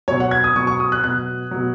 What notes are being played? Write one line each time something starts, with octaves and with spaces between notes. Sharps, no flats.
B2 F#3 C#5
F#5
G#6
D#6
B2 F#3 C#6
C#6
D#6
F#6
B2 F#3 F#6
B2 F#3